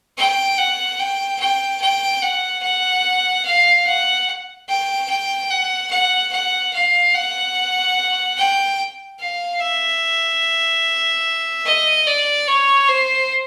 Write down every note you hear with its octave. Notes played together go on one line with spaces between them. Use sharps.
G5
F#5
G5
G5
G5
F#5
F#5
F5
F#5
G5
G5
F#5
F#5
F#5
F5
F#5
G5
F5
E5
D#5
D5
C#5
C5